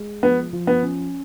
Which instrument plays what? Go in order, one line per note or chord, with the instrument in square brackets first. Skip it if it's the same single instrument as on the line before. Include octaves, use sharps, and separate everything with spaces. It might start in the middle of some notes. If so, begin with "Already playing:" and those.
Already playing: [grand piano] G#3
[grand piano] F3 [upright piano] B3
[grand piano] F3
[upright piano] B3
[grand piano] C#4